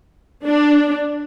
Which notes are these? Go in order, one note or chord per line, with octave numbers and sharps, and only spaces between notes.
D4